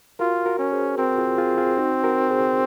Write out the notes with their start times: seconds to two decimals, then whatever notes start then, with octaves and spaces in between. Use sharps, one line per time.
0.19 F4 F#4 A#4
0.46 F#4 A#4
0.59 C#4
0.72 G#4 C5
0.98 C4 F#4 A#4
1.18 F4 G#4
1.38 F4 G#4
1.58 F4 G#4
1.77 D#4 F#4
2.04 F#4 A#4
2.30 G#4 C5